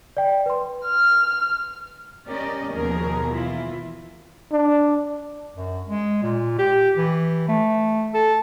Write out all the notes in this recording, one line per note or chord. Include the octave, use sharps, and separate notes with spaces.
D5 G5
B4 C6
F6
C#4 G4 A#4 D5 D#5
D#2 B2 F3 G#4 A#4
E3 E4 F4
D4
F#2
G#3
A#2
G4
E3
A3
A4